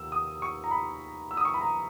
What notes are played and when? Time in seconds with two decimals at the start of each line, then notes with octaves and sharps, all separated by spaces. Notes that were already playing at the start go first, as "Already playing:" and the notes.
Already playing: D#2 E6
0.12 D#6
0.42 C#6
0.64 A#5
0.71 B5
1.31 E6
1.37 D#6
1.45 C#6
1.54 B5
1.61 A#5